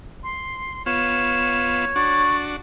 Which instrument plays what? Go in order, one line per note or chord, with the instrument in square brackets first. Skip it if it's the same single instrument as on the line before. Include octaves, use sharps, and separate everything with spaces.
[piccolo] C6
[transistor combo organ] B3 F4 [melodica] C#5 [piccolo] E7
[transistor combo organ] D4 F#4 [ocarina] C#6 [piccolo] A6